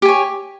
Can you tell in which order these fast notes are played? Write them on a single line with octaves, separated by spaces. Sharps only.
G4 G#5 C#5